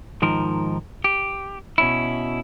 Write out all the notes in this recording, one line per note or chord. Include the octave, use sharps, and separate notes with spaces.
G#2 D#3 F3 A#4
G4
B2 C#4 E4